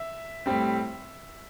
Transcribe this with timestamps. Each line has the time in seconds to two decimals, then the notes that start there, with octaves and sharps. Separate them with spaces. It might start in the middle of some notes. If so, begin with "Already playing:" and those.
Already playing: E5
0.46 A2 G3 C4